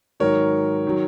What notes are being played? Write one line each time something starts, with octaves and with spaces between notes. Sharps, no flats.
G#2 D#3 F#3 A#4 C#5
D#3 F#3